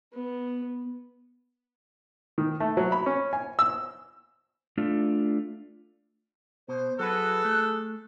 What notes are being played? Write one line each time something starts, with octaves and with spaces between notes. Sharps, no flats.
B3
D#3
A3
F#3
B5
C#4
G#5
E6
A3 D4 F4
B2 C5
F#3 F#4 G#4 A4 B4 F#6
A3